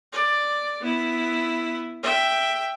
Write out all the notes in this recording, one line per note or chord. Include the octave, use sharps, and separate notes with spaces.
D5
B3 E4
E5 G5